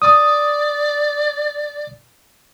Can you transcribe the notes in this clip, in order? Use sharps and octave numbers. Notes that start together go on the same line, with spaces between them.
D5 D#6